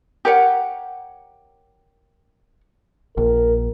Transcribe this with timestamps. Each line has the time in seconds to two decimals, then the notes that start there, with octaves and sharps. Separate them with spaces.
0.25 G4 A#4 C#5 F#5
3.17 A#1 A#4